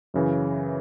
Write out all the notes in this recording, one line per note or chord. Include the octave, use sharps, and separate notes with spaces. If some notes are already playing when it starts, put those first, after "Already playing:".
F#2 C#3 E3